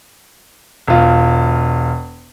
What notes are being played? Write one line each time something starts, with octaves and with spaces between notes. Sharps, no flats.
E1 F4